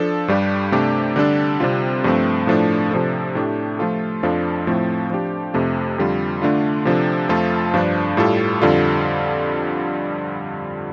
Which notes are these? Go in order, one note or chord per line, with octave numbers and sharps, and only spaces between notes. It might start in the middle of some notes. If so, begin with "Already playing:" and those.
Already playing: F3 D4 A4
G2 G3 D4 G4
C3 A3 D4 G4
D3 G3 D4 A4
C3 G3 C4 F4
G2 F3 A3 C4
A2 F3 A3 D4
C3 F3 D4 A4
A2 A3 D4 G4
F3 A3 F4 A4
F2 F3 D4 F4 A4
A2 F3 A3 C4 A4
F3 D4 G4
F2 C3 A3
F2 D3 G3 F4
D3 A3 D4 F4
C3 F3 D4 A4
F2 F3 A3 F4 A4
G2 F3 D4
A2 G3 F4 A4
F2 D3 G3 F4 A4